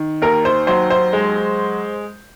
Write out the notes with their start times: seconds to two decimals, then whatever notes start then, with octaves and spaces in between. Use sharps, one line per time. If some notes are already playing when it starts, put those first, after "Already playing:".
Already playing: D#3
0.22 D#2 A#4
0.45 C5
0.67 F#3 C5
0.90 C5
1.13 G#3